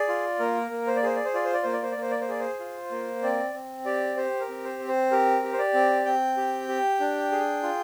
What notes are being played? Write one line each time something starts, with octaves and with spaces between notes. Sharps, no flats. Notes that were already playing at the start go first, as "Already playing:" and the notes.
Already playing: G#4 D5
F4
A#3 A#4
A#3
C5
D5
G#4 C5
D5
C5
F4 D5
C5
D5
A#3 C5
D5
C5
D5
A#3 C5
D5
C5
G#4 D5
C5
F4
A#3
C4 D5
C4
G4 D5
G4 C5
A#4
C4
C5
C4
C5
G4 A#4
G4
C5
D5
C4
C4 G5
G4
G4
D4
G#4
F4